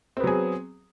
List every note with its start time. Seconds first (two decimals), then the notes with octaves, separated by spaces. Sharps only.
0.17 C4
0.20 B3
0.24 F#3
0.27 G#4